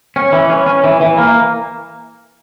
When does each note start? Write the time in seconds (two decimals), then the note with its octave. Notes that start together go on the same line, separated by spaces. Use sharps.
0.16 C#4
0.32 E3
0.50 C#4
0.66 C#4
0.84 E3
1.01 E3
1.17 A#3